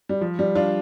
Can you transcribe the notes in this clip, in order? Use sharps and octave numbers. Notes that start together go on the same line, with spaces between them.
G3
F3
G3
D4 F4